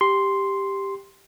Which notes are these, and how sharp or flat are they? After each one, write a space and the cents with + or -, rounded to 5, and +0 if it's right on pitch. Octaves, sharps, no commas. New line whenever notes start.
G4 +5 C6 +0